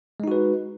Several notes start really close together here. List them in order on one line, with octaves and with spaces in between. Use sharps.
G#3 D#4 F#4 B4